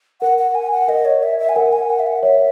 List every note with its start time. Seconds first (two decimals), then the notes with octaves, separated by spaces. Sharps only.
0.21 A#4 F#5
0.39 F#5
0.55 G#5
0.71 F#5
0.88 A#4 D#5
1.05 C#5
1.23 E5
1.39 E5
1.49 G#5
1.56 A#4 F#5
1.73 G#5
1.90 F#5
1.99 E5
2.07 F#5
2.23 C#5 E5